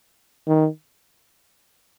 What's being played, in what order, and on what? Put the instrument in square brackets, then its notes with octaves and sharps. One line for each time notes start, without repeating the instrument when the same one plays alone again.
[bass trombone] D#3